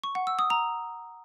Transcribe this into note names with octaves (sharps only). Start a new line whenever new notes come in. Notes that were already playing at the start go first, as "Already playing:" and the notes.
C#6
F#5
E6
D#6
A#5